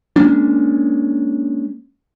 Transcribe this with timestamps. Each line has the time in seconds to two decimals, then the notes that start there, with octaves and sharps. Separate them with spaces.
0.16 G#3 A#3 C#4 D4